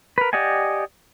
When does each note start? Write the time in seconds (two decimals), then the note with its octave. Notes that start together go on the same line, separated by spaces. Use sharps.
0.18 A#4 B4
0.33 G4 D5 D#5 F#5 G#5